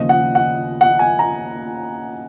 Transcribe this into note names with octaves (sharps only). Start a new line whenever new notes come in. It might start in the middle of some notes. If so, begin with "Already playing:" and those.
Already playing: D#2 C#3 F3 D#5
F#5
F#5
F#5
G#5
A#5